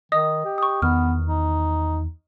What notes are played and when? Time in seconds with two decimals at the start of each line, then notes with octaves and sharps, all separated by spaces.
0.12 D#3 D#5 D#6
0.45 G4
0.58 C#6 D#6
0.82 E2 D#3 B3 F6
1.26 D#4